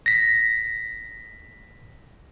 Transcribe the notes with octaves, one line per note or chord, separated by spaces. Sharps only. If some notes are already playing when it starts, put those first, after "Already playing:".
A#6 B6